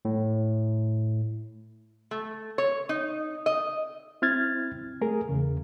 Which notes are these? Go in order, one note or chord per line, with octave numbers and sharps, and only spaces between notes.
A2
A3
C#5
D#4
D#5
C4 E4 F6 G#6 A6
A3 G#4 A#4
E2 C#3